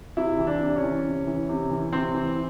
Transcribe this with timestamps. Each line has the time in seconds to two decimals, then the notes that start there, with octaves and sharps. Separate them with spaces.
0.17 C3 E4
0.38 E3
0.47 D4
0.61 C3
0.76 C#4
0.83 E3
1.05 C3
1.27 E3
1.49 C3
1.70 E3
1.93 C3 C4
2.14 E3